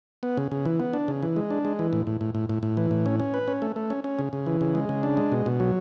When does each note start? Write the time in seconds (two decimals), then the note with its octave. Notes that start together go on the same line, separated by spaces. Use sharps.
0.23 B3
0.37 C#3
0.52 C#3
0.65 E3
0.80 B3
0.93 D4
1.08 C#3
1.23 E3
1.36 G#3
1.50 D4
1.65 G#3
1.79 E3
1.93 A2
2.07 A2
2.21 A2
2.35 A2
2.49 A2
2.63 A2
2.77 E3
2.91 A2
3.06 C#4
3.20 C#4
3.34 B4
3.48 C#4
3.62 A3
3.76 A3
3.90 C#4
4.04 C#4
4.19 C#3
4.33 C#3
4.46 E3
4.61 C#3
4.75 G#3
4.89 C#3
5.03 D4
5.17 G#3
5.32 B2
5.46 B2
5.60 F#3